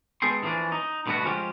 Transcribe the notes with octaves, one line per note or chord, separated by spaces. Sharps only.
G#3 B3 G#4 A4 G5 C6
E3 F3 A#3 C#4 D4
D#4
G2 B2 D3 A3 B3 F#4
F3 G#3 C#4 F4 G4